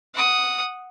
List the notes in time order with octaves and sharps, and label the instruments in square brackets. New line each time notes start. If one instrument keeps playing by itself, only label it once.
[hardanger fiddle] F#5 D#6